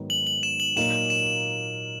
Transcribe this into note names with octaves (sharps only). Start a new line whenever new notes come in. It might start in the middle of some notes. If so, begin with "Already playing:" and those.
Already playing: G#2 D#3 F#3 B3
F#7
F#7
E7
F#7
A#2 F#3 A#3 D#4 E7
E7